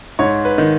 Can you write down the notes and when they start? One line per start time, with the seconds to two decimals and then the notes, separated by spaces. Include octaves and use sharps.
0.19 G#2 C#5
0.45 B4
0.58 D#3